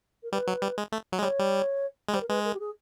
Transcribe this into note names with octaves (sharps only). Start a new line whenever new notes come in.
A#4
G3 B4
F#3
G3
G#3
A3
F#3
G#3
G3 C#5
G3
G#3
G3 C5
A#4
G#3 B4
A#4
G4
G#4